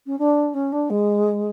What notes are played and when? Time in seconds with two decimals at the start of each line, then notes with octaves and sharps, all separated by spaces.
0.06 C#4
0.18 D4
0.54 C#4
0.72 D4
0.90 G#3